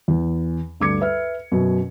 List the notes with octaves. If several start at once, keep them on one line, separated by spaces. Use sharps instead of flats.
E2
D2 G2 D6 G#6 C#7
B4 E5 F6
F#2 B2